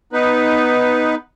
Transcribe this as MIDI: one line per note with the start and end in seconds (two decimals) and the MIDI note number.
0.13 1.15 59
0.13 1.15 63
0.13 1.15 71